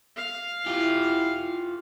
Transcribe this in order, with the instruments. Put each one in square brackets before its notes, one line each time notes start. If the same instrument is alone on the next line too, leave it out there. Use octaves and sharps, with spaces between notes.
[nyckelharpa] F5
[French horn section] E4 [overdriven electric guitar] F4 G4